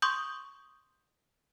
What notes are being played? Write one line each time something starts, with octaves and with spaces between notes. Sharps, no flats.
C6 C#6 D#6 G6